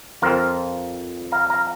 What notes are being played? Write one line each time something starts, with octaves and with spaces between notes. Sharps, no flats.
F2 F3 C4 F4 A#4
F5 A#5
F5 A#5